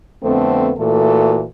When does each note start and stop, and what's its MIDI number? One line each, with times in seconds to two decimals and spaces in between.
0.23 0.70 41
0.23 0.70 50
0.23 0.70 57
0.23 0.70 59
0.23 0.70 60
0.78 1.43 46
0.78 1.43 52
0.78 1.43 57
0.78 1.43 66
0.78 1.43 69